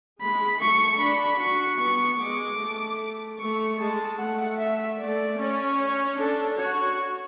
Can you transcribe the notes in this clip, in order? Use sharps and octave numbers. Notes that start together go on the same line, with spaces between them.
G#3 B5
A3 C#6
D4 B5
F#4 C#6
B3 C#6
G#3 D6
A3
A3 C#6
G#3 A5
A3 F#5
E5
A3 D5
C#4
C#5
D4 A4
F#4 C#5